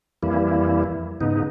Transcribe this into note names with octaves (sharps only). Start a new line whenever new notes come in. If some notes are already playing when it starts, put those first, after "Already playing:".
F2 E3 G3 A#3 E4
G#2 C#3 B3 D#4